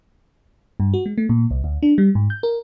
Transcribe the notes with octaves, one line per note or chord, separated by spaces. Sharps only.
G2
F#4
G#3
A3
A#2
C2
D2
D4
G3
G#2
G6
A#4